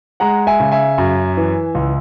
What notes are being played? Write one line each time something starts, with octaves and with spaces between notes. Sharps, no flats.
G#3 F#5 A#5
E5 G#5
C#3
E5 G#5
F#2
E3
C#2